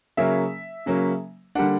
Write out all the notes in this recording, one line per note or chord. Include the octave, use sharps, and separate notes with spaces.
C#3 F#3 A#3 C#4 E5
C#3 F#3 A#3 C#4
D3 G3 A#3 D4 F#5